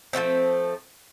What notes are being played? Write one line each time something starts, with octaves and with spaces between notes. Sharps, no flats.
F3 G#3 A3 C4